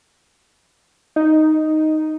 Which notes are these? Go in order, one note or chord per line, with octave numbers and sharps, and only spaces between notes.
D#4